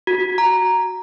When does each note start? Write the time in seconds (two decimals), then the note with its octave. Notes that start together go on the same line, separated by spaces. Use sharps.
0.07 F#4
0.38 A#5